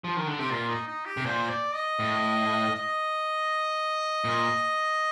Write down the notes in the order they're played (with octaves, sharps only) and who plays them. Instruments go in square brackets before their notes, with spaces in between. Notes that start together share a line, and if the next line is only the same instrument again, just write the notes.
[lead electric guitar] F3
D#3
D3
[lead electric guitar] C3 [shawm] G4
[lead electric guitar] A#2 [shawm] F4
[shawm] D#4
D#4
G4
[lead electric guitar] C3
[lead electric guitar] A#2 [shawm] C5
[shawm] D5
D#5
[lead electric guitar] A2
[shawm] D#5
[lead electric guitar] A#2